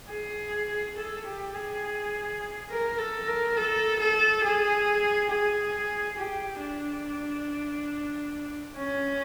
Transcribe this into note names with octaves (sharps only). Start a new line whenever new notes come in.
G#4
A4
G4
G#4
A#4
A4
A#4
A4
A4
G#4
G#4
G4
D4
C#4